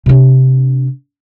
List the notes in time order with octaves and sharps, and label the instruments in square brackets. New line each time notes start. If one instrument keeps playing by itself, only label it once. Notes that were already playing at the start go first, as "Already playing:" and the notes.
[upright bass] C3 D4